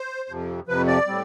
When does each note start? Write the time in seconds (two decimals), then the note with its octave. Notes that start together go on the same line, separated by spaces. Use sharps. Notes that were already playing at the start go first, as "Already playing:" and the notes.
Already playing: C5
0.29 F2 C3 F3
0.67 F2 C3 F3 B4
0.87 D5
1.07 A2 G3 C4